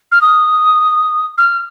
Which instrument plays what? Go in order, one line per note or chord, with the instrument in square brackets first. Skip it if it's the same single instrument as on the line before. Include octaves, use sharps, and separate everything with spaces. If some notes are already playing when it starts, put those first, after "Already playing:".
[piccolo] F6
D#6
F6